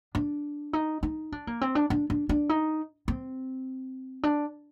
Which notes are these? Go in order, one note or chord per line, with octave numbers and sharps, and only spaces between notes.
D4
D#4
D#4
D4
A#3
C4
D4
D4
D4
D4
D#4
C4
D4